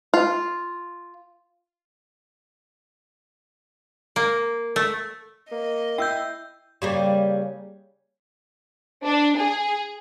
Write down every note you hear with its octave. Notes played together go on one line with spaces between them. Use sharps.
F4
A#3
A3
A#3 D#5
E4 G5 E6 G6
C#3 G3 A#3
D4
G#4